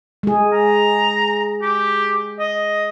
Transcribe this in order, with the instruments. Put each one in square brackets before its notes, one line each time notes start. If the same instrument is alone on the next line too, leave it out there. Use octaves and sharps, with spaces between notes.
[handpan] G#3 G#4
[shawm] A#5
G4
D#5